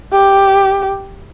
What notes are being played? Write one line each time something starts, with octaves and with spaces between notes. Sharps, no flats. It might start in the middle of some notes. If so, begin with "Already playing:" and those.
G4